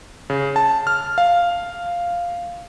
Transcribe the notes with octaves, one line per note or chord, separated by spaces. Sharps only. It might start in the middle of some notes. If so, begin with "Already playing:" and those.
C#3
A5
F6
F5